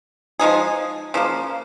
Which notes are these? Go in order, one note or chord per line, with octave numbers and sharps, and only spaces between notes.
F3 G#3 D#4 G#4
C#3 F3 A#3